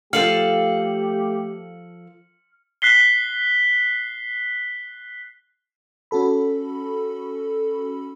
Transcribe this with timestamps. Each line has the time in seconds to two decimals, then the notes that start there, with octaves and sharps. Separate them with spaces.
0.13 F3 A3 G4 A4 F5 F6 C#7 F#7
2.82 F#6 B6 C7 G7
6.11 C#4 F#4 A4 B5